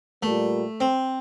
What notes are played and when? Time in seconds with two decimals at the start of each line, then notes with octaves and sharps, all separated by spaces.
0.23 A#2 G3 A3 A#3
0.80 C4